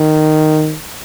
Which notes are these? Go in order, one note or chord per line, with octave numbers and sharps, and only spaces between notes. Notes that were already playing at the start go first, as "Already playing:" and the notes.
Already playing: D#3